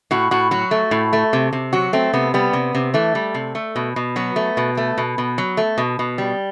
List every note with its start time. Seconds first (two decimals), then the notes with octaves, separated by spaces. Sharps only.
0.11 A2 F#4
0.31 A2 F#4
0.51 F#3 F#4
0.71 A3
0.91 A2
1.13 A3
1.33 C3
1.53 C3
1.73 F#3 F#4
1.93 A3 C4
2.13 C3 B3
2.34 G3 B3
2.53 C3
2.75 C3
2.94 E3 A3
3.15 G3
3.34 C3
3.55 A3
3.76 B2
3.96 B2
4.16 F#3 B3
4.36 A3
4.57 B2
4.77 A3
4.98 B2
5.18 B2
5.38 F#3
5.57 A3
5.78 B2
5.99 B2
6.18 G3